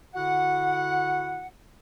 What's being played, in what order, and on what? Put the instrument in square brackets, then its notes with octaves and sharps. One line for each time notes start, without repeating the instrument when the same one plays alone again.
[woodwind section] D3 E4 F#4 F#5